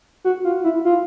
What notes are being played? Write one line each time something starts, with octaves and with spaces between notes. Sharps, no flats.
F#4
F4
E4
F4